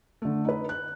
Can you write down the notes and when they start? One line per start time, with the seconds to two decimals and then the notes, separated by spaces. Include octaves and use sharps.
0.22 D3 A3
0.45 D#4 B4
0.69 F#6